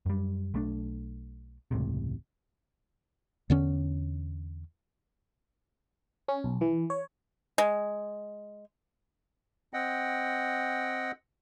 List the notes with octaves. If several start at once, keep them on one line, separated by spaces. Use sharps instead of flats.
F#2 G3
B1 A3 D4
E1 C#2 A2 C3
E2 D3 C#4
C#4
B1
E3
C#5
G#3
C4 D#5 F#5 G5